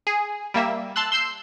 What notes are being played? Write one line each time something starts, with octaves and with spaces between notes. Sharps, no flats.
G#4
G3 A#3 E5
A5 C6 E6 F#6
C6 E6 G6 C7